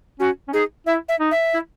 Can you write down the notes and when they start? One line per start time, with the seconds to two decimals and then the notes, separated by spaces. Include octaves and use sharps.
0.19 C#4 F#4
0.48 C#4
0.53 D#4 G#4
0.87 E4 E5
1.09 E5
1.20 D#4
1.31 E5
1.54 E4